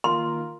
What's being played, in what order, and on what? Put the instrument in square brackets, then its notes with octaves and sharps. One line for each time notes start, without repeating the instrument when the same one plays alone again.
[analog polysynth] D#3 A#3 F4 A#4 [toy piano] C6